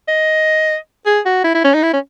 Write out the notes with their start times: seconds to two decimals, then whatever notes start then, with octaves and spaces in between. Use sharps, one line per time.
0.08 D#5
1.06 G#4
1.26 F#4
1.44 E4
1.55 E4
1.64 C#4
1.74 D#4
1.83 E4
1.93 C#4